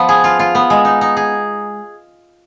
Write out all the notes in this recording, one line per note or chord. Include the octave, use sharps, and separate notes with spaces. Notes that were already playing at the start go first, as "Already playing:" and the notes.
Already playing: F3 B3
G#4
F4
F4
B3
G#3
D#4
D#4
G#4